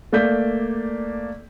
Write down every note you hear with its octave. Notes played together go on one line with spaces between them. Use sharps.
A3 A#3 D5 G6 B6